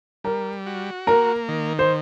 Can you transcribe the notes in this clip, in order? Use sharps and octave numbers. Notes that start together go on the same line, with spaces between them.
G3 A#4
F#4
A#3 A#4
D#3
C5